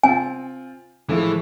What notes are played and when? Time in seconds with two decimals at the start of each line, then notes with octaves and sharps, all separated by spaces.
0.03 C4 F4 G#5
1.09 A2 E3 F3 G#3